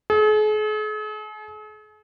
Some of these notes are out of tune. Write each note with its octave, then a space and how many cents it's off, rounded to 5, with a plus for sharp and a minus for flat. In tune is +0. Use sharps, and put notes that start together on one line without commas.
G#4 +45